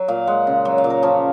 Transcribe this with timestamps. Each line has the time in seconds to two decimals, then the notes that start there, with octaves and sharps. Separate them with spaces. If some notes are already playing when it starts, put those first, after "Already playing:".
Already playing: F#3
0.08 A#2 F5
0.27 G#3 F#5
0.47 C#3
0.65 F#3
0.78 F5
0.84 A#2
0.90 A#4
1.03 F3 C#4